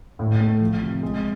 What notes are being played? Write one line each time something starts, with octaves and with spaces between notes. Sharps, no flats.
A2
A3
F3
C3
G#3